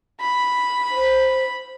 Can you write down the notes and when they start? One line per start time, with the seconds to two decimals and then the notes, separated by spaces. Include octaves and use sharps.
0.21 B5
0.91 C5